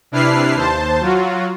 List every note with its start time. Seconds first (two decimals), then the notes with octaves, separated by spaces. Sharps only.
0.12 C3 D4 E4 B4 F6 C7
0.54 D#2 C5 A5
1.01 F#3 F4 F#4